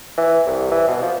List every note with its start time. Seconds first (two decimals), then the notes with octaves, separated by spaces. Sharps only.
0.18 E3
0.47 C2
0.72 E3
0.88 B2
1.03 F3